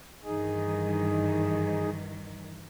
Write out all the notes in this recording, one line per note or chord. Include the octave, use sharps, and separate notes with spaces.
G2 D#3 E3 D#4 G#4